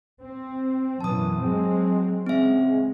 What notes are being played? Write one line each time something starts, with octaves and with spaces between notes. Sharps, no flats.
C4
F#2 B2 E3 A5 D#6
F#3 G#3 C4
C#3 G#3 C4 E5